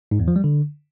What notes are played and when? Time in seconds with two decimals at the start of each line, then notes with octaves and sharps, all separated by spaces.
0.11 G#2
0.20 E2
0.28 F3
0.36 G3
0.44 D3